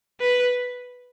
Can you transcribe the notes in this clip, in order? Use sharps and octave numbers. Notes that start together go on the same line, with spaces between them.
B4